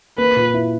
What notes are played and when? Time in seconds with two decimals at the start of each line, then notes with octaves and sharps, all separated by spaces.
0.18 A#3 B4
0.36 A#2
0.54 E4